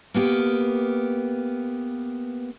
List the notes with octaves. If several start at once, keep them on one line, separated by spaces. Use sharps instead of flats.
A#3 B3 G4